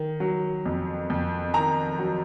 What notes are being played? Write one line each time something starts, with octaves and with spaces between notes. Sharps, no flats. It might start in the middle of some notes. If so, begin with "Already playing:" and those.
Already playing: D#3
F#3
F2
F2
D#3 A#5
F#3